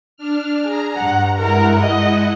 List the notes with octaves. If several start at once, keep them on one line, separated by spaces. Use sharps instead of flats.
D4 F6
G#4 A#5
G2 F#5
G#3 E4 A#4 F#5
D#5